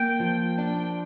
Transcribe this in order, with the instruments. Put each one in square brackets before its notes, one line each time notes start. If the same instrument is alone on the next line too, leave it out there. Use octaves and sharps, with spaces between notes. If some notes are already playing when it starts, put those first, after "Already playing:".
Already playing: [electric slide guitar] A#3 [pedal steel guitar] G5
[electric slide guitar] F3
D4